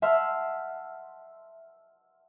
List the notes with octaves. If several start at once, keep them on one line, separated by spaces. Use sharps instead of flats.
E5 F#5 A5 C6 F6 F#6